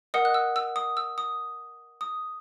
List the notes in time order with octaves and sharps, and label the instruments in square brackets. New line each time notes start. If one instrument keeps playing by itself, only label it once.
[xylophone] A#4 D#5 F#5 D#6
F#6
E6
E6
D#6
E6
D#6
D#6